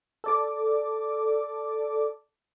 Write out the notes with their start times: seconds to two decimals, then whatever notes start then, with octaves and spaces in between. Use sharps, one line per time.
0.24 A4 D5 D6